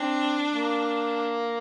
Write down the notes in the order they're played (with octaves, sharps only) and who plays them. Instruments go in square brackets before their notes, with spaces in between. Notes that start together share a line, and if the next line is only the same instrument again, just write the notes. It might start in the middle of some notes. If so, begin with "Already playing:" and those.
Already playing: [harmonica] C4 [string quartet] D4
[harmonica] A#3